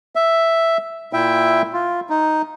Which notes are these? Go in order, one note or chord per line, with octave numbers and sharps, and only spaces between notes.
E5
A#2 E4 E5 G5
F4
D#4